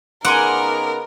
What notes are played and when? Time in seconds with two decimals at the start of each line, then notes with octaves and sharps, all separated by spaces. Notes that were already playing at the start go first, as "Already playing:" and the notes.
0.25 C#3 B3 D#4 A#4 F#5 G#5 C6 D6